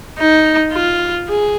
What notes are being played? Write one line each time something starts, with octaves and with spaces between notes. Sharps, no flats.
D#4
F4
G#4